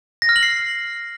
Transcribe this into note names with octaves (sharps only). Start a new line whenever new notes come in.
A#6
F6
F#7
C7